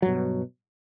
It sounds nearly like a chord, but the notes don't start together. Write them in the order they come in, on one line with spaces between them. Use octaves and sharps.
F#3 G2 B2